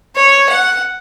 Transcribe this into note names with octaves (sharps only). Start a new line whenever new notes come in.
C#5
F#5